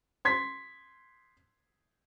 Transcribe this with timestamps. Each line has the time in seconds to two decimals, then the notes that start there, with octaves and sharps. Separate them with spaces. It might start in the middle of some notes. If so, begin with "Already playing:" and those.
0.25 C6 G#6 B6